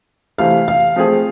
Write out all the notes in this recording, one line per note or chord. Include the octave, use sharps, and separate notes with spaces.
C3 E3 A3 F5
F5
F3 A3 C4 F4 G#4